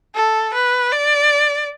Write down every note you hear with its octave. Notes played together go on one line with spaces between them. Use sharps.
A4
B4
D5